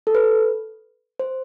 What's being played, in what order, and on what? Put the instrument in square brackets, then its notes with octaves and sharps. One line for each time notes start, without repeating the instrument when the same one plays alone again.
[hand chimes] A4
B4
C5